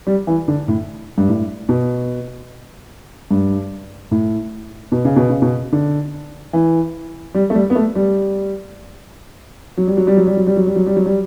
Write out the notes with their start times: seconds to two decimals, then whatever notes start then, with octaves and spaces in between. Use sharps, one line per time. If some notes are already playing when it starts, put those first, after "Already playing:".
0.07 G3
0.27 E3
0.48 D3
0.68 A2
1.18 G2
1.29 A2
1.69 B2
3.31 G2
4.11 A2
4.92 B2
5.05 C#3
5.16 B2
5.30 C#3
5.42 B2
5.72 D3
6.53 E3
7.34 G3
7.50 A3
7.55 G3
7.70 B3
7.75 A3
7.95 G3
9.77 F#3
9.87 G3
9.97 F#3
10.07 G3
10.17 F#3
10.27 G3
10.36 F#3
10.47 G3
10.56 F#3
10.67 G3
10.76 F#3
10.86 G3
10.96 F#3
11.06 G3